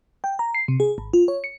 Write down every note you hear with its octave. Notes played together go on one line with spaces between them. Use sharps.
G5
A#5
C7
C3
G#4
G#1
F4
C#5
C#7